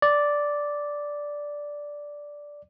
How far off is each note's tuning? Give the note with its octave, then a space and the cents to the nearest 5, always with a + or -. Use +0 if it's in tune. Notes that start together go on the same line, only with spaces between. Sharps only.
D5 -5